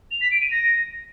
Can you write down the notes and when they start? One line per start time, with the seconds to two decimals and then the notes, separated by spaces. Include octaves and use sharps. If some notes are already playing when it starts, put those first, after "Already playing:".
0.11 F7
0.21 B6
0.31 D7
0.41 D#7
0.51 A#6